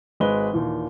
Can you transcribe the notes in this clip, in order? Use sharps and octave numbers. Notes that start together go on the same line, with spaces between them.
G#1 G#3 B4 G7
D#2 A#2 E3